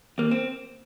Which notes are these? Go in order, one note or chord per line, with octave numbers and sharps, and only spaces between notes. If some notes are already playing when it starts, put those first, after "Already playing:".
D#2 A#3
C4